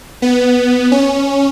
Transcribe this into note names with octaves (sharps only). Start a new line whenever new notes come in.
B3
C#4